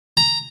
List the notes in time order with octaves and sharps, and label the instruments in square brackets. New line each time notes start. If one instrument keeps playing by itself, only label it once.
[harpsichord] A#5